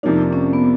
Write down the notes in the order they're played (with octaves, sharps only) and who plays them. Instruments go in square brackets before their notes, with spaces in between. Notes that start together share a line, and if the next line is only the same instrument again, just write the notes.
[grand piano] F2 C3 F3 A#3 D4 [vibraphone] D#4
[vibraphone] C#4
B3